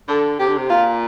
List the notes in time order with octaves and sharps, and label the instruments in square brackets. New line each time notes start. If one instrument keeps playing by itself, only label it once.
[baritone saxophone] D3 [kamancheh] A4
[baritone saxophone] C3 [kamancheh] G4
[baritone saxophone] D3
C3
[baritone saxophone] A#2 [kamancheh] F4